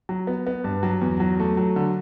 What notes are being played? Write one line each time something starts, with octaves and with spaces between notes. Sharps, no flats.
F#3
B3
B3
G2
F#3
E2
F#3
A3
F#3
D3